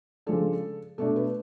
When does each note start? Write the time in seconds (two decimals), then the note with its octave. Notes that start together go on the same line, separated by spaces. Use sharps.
0.26 C#3 F3 G#3 D4 A4
0.98 B2 A3 D4 A4
1.16 B4